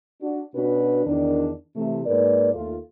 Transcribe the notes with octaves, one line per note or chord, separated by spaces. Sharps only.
D4 F#4
B2 C#4 D4 F#4 B4
E2 D#3 D4
C3 E3 A3
G#2 A#3 A#4 B4 D5
D#2 A3 F4